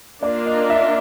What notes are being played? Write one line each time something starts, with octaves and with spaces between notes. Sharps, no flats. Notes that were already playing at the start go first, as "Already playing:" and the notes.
A#3 D4 F4 A#4 D5
D#5
E5